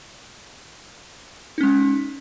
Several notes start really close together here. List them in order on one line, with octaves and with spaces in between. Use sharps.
D#4 C#4 G#3